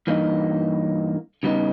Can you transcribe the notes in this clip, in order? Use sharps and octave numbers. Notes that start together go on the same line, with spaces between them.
G2 E3 A#3 D#4
C#3 G3 B3 D#4